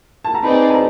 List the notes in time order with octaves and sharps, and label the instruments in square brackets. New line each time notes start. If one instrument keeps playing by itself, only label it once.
[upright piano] A5
A#5
[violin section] C4 D#4 G#4 B4 D5 [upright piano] B5
[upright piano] A5
A#5